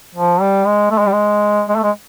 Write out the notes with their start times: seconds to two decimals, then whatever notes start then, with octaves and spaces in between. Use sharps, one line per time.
0.15 F3
0.41 G3
0.66 G#3
0.91 A3
0.99 G#3
1.06 G3
1.12 G#3
1.69 G#3
1.76 A3
1.83 G#3